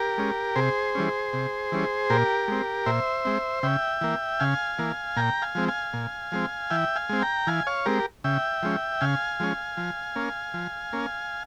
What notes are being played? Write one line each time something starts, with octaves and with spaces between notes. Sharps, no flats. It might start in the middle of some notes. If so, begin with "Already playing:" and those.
Already playing: G4 A#4
G#3 C#4
C3 G#4 C5
E3 G3 C#4
C3
E3 G3 C#4
A#2 G4 A#4
G#3 C4
A#2 C5 E5
G#3 C4
C#3 E5 G5
E3 A#3
C#3 F5 G#5
E3 A#3
A#2 G5 A#5
F5 G#5
F3 G#3 C4
F5 G#5
A#2
F3 G#3 C4
E3 E5 G5
F5 G#5
G#3 C4
G5 A#5
E3 F5 G#5
C#5 F5
G#3 C4 G4 A#4
C#3 E5 G5
F3 G#3 C#4
C#3 F5 G#5
F3 G#3 C#4
F3
A#3 C#4
F3
A#3 C#4